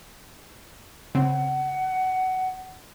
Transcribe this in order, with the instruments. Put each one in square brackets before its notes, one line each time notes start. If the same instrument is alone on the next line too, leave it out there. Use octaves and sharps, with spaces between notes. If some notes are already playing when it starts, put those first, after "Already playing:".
[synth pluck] C#3 C4 [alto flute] F#5